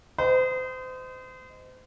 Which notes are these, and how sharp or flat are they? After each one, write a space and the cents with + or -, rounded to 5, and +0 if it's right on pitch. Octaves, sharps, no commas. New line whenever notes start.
C5 -35 D#5 +0